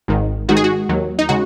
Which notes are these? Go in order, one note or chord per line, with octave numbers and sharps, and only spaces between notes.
G#1 G#2 D#3
G#2 D#3 G#3 D#4 F#4
G#4
F#4
D#2 D#3 F#3
D#4
C#3 G#3 F#4